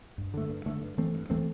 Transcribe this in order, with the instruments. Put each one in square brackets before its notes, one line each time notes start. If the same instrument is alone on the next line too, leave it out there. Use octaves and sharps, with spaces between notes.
[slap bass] G2
D3 A3
G2
D3 A3
G2
E3 A3 C4
G2
E3 A3 C4